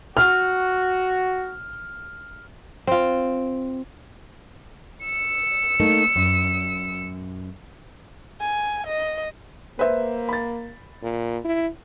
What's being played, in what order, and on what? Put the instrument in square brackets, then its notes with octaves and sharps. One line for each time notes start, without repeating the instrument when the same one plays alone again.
[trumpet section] F#4 [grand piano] F6
[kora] C4 F4
[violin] E6 C#7
[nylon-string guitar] A3 A#3 D#4
F#2
[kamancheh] G#5
D#5
[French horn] A#3 [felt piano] B4 C5 E5
[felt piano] B5 A6
[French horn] A#2
E4